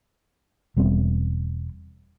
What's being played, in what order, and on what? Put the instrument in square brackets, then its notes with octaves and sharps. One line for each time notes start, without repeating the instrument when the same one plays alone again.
[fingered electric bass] E1 G3 B3 C4